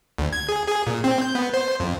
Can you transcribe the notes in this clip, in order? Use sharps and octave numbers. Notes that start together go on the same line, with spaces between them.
D2
G#6
G#4
G#4
A#2
C4
G6
B3
C5
F2